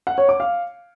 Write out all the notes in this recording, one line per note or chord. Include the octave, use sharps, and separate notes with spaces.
F#5
C#5
D6
F5